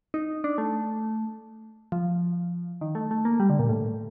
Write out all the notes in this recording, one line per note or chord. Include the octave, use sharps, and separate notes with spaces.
D#4
D4
A3
F3
D#3
A3
A3
A#3
G3
D3
A#2
A2